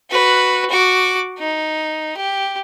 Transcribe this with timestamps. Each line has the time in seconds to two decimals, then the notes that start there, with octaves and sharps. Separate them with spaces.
0.11 F#4 B4
0.70 F#4 D6
1.39 D#4
2.17 G4